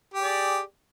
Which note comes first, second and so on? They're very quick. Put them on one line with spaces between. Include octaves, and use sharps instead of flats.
G4 G#4 D5